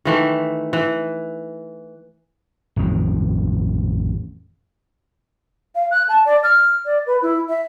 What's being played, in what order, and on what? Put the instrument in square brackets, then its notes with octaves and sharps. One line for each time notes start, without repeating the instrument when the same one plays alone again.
[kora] D#3 E3 A3
E3
[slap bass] A1 F2 D#3
[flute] F5
F#6
A5
D5
F6
D5
B4
E4
E5